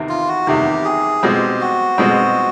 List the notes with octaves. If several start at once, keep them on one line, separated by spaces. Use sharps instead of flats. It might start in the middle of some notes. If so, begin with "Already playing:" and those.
Already playing: E2 C3 D#3
F4
F#4
E2 C3 D#3 G4
G#4
B2 G#3 C4 G4
F#4
B2 G#3 C4